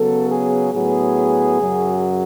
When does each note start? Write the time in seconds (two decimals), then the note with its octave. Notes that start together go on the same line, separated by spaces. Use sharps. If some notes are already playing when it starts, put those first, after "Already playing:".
Already playing: C#3 F#3 B3 A4
0.30 G#4
0.73 A2 F#3 B3 G#4
1.60 F#2 C#3 F#3